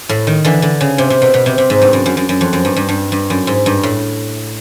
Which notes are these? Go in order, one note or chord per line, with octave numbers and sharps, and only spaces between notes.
A2
D#3
D3 E3
D3
C#3
C3
C3
B2
B2
C3
C3
G#2
G2
F#2
F#2
F#2
F#2
F2
F#2
G2
G2
G2
G2
F#2
G#2
G2
A2